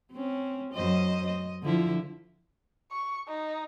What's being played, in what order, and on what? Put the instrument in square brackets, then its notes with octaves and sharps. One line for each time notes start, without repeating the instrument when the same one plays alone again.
[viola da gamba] C4 C#4
F#2 C5 D#5
D#5
D3 F3 E4
[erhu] C#6
D#4